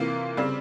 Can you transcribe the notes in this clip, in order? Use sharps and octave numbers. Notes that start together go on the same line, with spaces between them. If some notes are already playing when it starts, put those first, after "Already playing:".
Already playing: C3 E3 A#3 F4
C#3 G3 C4